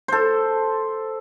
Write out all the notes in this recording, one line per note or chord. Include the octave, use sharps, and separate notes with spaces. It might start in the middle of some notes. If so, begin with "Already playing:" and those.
A4 C5